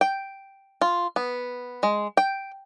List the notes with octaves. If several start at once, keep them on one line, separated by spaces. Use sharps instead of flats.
G5
F4
B3
G#3
G5